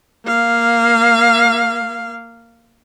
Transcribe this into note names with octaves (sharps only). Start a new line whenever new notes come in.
A#3 F5